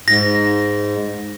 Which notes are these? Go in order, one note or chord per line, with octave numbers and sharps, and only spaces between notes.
G#2 A#6